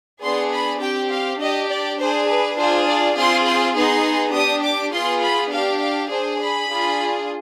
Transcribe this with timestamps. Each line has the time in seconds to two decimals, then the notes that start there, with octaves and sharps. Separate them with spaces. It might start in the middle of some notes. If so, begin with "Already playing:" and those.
0.22 B3 D4 G#4 C6
0.52 B5
0.81 C4 G4 G5
1.10 F5
1.40 D4 G4 D#5
1.69 D5
1.98 D4 G#4 C5
2.28 B4
2.57 D4 F4 G#4 C5
2.87 D5
3.16 C4 F4 G#4 C6
3.46 C6
3.75 B3 D#4 G#4 C6
4.34 D4 G4 D#6
4.64 D6
4.93 B3 F4 G#4 C6
5.22 B5
5.52 D4 G4 F5
5.81 F5
6.10 D4 G#4 C5
6.40 B5
6.69 D4 F4 G#4